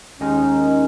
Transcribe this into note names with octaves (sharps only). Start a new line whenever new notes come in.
D#2 D#3 G#3 C#4 D#4